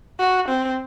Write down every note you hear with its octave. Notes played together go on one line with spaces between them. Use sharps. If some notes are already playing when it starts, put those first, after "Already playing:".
F#4
C4